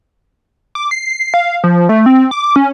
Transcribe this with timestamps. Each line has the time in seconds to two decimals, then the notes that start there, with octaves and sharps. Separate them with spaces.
0.75 D6
0.91 C7
1.34 F5
1.64 F3
1.89 A3
2.06 C4
2.31 D6
2.56 C#4